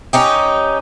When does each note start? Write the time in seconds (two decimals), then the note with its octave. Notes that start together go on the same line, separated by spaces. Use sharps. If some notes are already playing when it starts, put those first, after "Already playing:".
0.13 C#4 D#4 G4